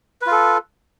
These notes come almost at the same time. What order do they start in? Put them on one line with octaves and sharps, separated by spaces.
B4 F4 A4